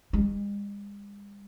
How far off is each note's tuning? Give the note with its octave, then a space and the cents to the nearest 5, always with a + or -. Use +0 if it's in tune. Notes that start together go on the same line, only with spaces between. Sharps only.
G#3 -45